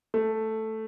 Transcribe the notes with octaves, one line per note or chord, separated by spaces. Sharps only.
A3